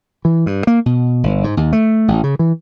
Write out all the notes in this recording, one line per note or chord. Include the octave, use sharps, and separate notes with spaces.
E3
G2
A#3
B2
G1
G#2
D#2
A3
A1
C#3
E3